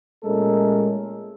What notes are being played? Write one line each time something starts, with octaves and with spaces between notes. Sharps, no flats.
A#2 G#3 A3 C#4 A4 A#4